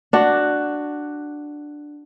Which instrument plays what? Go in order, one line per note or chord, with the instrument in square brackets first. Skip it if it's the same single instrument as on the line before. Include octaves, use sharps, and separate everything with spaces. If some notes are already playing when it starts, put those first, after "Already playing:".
[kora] D4 F#4